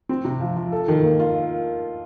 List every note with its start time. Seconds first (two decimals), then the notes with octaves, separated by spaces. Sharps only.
0.09 C4
0.25 C3
0.41 F3
0.56 F3
0.72 A4
0.88 D#3
1.04 A#3
1.20 F4